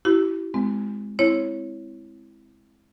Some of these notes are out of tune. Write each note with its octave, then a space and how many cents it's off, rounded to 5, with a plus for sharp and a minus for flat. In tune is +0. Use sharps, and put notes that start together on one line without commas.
E4 +0 G4 -35
G#3 +0 C4 -25
C4 +0 E4 +0 C#5 -10